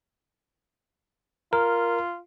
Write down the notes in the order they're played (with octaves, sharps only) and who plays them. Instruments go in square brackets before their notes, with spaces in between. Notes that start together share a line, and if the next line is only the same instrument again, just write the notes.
[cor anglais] F4 [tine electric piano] A#4